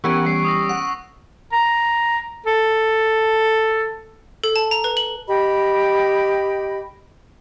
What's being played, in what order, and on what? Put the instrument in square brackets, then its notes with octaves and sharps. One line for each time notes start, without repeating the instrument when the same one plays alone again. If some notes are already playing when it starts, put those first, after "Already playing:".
[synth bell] E3 B3 C#4 [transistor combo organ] G4 A#4 F#5 [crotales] C#6 D7
[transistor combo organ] G3 [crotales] C7
[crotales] D#6 E6 A#6
[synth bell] F#5
[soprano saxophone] A#5
A4
[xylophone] A4
A5
A#5
B4
F#7
[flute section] G4 D#5 B5